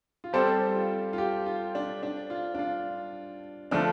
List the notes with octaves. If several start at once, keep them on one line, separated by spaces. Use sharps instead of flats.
F4
G3 C4 G4 A4 C5
F4
F4
G4
F4
D4
D4
F4
D4
F4
D3 F3 A3 D4